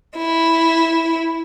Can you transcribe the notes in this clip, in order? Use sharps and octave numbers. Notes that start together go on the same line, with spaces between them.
E4